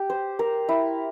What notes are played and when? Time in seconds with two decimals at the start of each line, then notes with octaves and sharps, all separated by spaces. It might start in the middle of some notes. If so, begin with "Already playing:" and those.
Already playing: G4
0.10 C5
0.39 A#4
0.69 E4